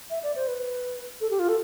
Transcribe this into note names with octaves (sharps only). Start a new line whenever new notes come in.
E5
D5
C5
B4
A4
G4
F4
A4